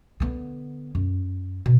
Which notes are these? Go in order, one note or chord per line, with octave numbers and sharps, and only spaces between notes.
D3 B3
F#2
B2